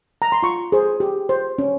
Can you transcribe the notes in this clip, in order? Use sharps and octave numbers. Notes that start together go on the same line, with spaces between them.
A#5
C6
F4 C#6
G#4 C5
G4
C5
C#4